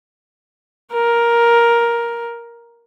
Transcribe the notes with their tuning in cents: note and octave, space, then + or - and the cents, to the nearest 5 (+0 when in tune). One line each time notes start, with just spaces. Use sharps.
A#4 +10